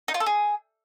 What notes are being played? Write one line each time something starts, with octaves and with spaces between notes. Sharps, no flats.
D#4
F4
A4
G#4